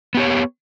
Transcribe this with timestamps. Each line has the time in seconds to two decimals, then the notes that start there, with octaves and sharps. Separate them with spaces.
0.15 B3
0.17 G4
0.20 C#5